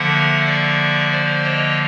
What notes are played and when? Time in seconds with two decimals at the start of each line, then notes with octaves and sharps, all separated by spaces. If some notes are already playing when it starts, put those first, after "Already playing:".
Already playing: D3 F3 A#3 E5 F#5
0.45 D5 E5
1.11 C5 D5
1.44 C#5 D#5